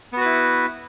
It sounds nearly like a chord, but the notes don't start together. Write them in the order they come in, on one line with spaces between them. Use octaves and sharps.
B3 F#4 B4 E4